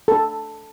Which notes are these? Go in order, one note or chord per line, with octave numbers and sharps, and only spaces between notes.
A4